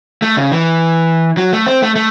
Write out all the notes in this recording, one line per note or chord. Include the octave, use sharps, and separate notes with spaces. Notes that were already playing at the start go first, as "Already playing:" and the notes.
A3
C#3
E3
F#3
A3
C4
A3
A3